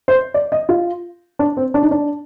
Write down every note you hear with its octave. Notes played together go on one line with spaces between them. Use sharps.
C5
D5
D#5
F4
D4
C4
D4
D#4
D4